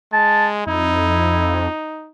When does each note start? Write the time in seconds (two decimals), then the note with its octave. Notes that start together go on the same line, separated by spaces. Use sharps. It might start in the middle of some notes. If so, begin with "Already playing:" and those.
0.13 G#3 A5
0.67 F2 D#4 E4